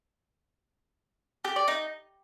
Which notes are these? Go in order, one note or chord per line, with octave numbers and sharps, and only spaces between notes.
G4
D5
D#4